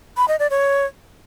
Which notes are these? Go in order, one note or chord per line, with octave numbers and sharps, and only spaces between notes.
B5
D#5
D5
C#5